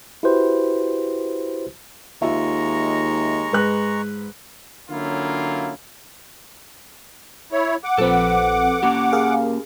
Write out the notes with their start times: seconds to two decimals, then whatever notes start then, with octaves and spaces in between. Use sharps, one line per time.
0.23 E4 F#4 G4 B4 C5
2.22 D#2 G#3 F4 E5 A#5 C#6
3.52 G#2 B4 F#6
4.89 D3 F#3 A#3 C#4 E4 F4
7.52 E4 C#5
7.84 F#5 D6
7.98 A#1 F3 C4 A4 B4
8.83 A#3 C#4 G4
9.12 G#4 A#4 F5